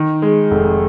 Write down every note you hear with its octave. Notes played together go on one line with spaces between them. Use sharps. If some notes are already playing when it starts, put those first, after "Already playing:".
Already playing: D#3
G#3
F1